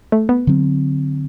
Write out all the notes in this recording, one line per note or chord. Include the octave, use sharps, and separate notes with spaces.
A3
B3
D3 F#3 C4